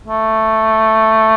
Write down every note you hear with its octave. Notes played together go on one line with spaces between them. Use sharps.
A3